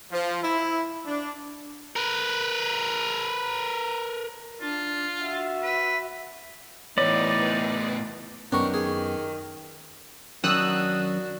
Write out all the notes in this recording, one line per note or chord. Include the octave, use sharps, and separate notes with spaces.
F3
E4
D4
A#4 B4
D4 F4
F#4 E5
B4
A2 E3 B3 D#4 B4 C#5 D5
F#2 D#3 B3 C#4 D4 G4 A#4 C#6
G#4
F#2 D#3 D4 F#4 D#6 E6 F#6